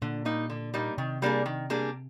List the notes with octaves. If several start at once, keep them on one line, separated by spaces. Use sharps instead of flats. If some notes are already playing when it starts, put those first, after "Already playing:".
A#2 D3
G3 A#3 D#4
D3
G3 A#3 D#4
C3 D#3
G3 A#3 D4 G#4
D#3
G3 A#3 D4 G#4